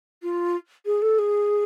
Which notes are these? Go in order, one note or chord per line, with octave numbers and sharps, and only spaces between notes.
F4
G#4
A4
G#4